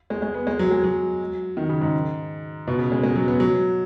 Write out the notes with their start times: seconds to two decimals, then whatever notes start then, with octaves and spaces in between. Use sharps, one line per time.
0.10 G#3
0.22 G#3
0.34 B3
0.47 G#3
0.59 F#3
0.71 G#3
0.84 F#3
1.57 D#3
1.69 C#3
1.81 G#2
2.68 B2
2.79 C#3
2.92 G#3
3.03 G#3
3.16 F#3
3.28 B3
3.40 F#3